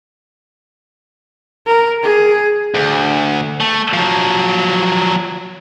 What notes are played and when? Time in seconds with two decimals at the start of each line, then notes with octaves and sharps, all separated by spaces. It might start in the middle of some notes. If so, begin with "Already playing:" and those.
1.66 A#4
2.03 G#4
2.74 D2
3.60 A3
3.93 F3 F#3